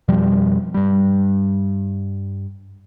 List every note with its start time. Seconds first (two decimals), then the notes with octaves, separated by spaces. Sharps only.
0.08 F2 B2 F3 G3
0.74 G2 G3